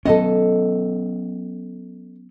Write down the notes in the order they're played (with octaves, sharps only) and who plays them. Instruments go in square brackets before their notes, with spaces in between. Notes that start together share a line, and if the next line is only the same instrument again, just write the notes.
[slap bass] F#3 B3 C#4 [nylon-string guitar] A4 D#5